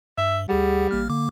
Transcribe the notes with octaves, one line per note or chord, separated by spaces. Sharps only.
G2 E5
D2 G3 G#4 F#5
A1 A#3 F6
D3 A#3 D6